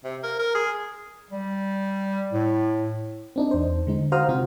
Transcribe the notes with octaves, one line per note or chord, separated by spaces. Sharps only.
C3
A#4
A#4
G#4
G3
A2
C4 D4 D#4
E2 C5
D3 G#3 D#4
F#4 C5 F5 A#5 D#6 F6
C3 C4 F4 F#4